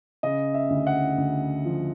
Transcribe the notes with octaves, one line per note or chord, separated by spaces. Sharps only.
C#3 D#5
E5
D2
F#5
D2
F3